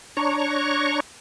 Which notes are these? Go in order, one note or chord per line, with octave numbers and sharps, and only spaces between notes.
D4 C#5 A#5 C#6